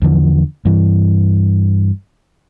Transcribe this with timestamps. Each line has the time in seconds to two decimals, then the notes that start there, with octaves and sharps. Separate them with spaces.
0.02 E2 D3 F3
0.65 G2 E3